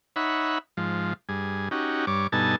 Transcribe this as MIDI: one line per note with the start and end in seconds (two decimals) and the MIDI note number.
0.16 0.58 63
0.16 0.58 73
0.16 0.58 76
0.16 0.58 78
0.16 0.58 83
0.77 1.13 44
0.77 1.13 53
1.29 1.69 43
1.29 1.69 68
1.71 2.06 61
1.71 2.06 63
1.71 2.06 66
1.71 2.06 67
2.07 2.27 43
2.07 2.27 73
2.07 2.27 86
2.32 2.56 43
2.32 2.56 47
2.32 2.56 63
2.32 2.56 69
2.32 2.56 80
2.32 2.56 81